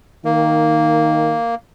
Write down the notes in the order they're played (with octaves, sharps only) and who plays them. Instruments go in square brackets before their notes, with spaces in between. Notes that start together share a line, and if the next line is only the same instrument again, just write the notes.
[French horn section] D#3 [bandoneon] A#3